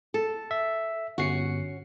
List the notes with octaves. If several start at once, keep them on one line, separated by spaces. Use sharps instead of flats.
A4
E5
G1 C#4 F#4 C7 C#7